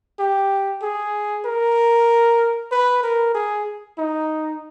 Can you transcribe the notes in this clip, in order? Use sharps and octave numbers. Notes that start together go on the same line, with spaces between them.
G4
G#4
A#4
B4
A#4
G#4
D#4